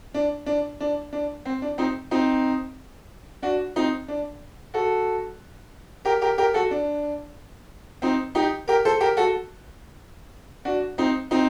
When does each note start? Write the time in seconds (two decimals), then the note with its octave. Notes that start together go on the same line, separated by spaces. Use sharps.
0.14 D4
0.46 D4
0.80 D4
1.13 D4
1.45 C4
1.62 D4
1.78 C4 D#4
2.11 C4 D#4
3.42 D4 F#4
3.76 C4 D#4
4.08 D4
4.74 F#4 A4
6.05 G4 A#4
6.21 G4 A#4
6.38 G4 A#4
6.54 F#4 A4
6.71 D4
8.02 C4 D#4
8.35 D#4 G4
8.68 G4 A#4
8.85 A4 C5
9.00 G4 A#4
9.17 F#4 A4
10.65 D4 F#4
10.98 C4 D#4
11.31 C4 D#4